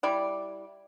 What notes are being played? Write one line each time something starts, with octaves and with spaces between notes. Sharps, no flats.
G3 E4 D5